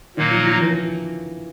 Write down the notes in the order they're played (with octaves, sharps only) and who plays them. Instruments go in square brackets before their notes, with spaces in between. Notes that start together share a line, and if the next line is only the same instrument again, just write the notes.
[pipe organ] A#2 F#3 A#3 D#4 [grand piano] D#3
[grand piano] F3
F3
E3